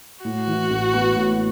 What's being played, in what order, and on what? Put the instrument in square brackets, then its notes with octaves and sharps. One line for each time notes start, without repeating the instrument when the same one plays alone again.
[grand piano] A2 [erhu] F#4
[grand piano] E3
A1
B3
A2